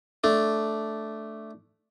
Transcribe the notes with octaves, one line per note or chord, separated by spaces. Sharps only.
A3 D4